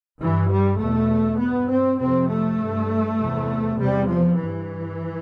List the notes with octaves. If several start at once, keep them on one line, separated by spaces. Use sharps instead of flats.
G2 E3
G3
E2 B2 A3
G2 B3
C4
F2 C3 C4
A3
G2
E2 C3
E2 C3 G3
F3
G2 E3